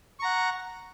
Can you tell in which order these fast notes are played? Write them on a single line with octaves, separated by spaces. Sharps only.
C#6 A#5 F#5